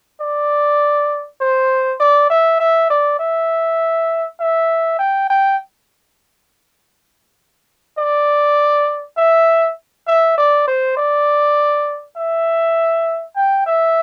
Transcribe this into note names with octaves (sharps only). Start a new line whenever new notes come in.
D5
C5
D5
E5
E5
D5
E5
E5
G5
G5
D5
E5
E5
D5
C5
D5
E5
G5
E5